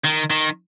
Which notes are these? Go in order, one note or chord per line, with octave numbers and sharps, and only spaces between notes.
D#3
D#3